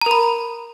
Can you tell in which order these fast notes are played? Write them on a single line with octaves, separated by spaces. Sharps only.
A#5 A#4 B5